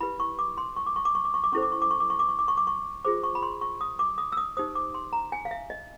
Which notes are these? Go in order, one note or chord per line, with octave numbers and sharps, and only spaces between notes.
E4 G4 B4 B5
C#6
D6
C6
C#6
D6
C#6
D6
C#6
D6
C#6
D6
C#4 E4 A4 C5 C#6
D6
C#6
D6
C#6
D6
C#6
D6
C#6
D6
C#6
D6
C#6
F4 G#4 C5 D6
C#6
B5
C6
C#6
D#6
D6
D#6
E6
D#6
D#4 G4 C5 D#6
D6
C6
A#5
G#5
F5
E5
D#5